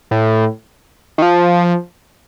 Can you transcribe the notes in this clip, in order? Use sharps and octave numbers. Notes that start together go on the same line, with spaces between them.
A2
D#3
F3